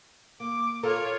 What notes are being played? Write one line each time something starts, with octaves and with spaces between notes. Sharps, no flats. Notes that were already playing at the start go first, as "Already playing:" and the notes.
A#3 D6
F4 A4 A#4 C#5